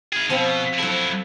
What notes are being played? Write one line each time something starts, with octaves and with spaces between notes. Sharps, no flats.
D#3 G#4
B2 F3 C4
F#3 E4 A4 C5